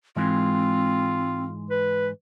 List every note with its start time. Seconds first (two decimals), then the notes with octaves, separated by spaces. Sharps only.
0.16 G#2 E3 G#3 C4 F4
1.70 B4